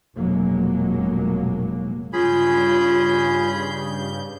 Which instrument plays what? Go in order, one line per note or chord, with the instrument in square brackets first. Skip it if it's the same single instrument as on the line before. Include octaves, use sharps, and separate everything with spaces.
[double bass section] F1 A#1 B2 F#3 G#3 A#3
[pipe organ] G2 C#3 G6 [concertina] C#4 G#4 B5 [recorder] F4